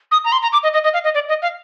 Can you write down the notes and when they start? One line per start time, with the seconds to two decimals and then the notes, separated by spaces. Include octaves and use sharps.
0.11 D#6
0.25 A#5
0.32 C6
0.42 A#5
0.53 D6
0.63 D#5
0.74 D#5
0.84 D#5
0.94 F5
1.04 D#5
1.15 D5
1.29 D#5
1.42 F5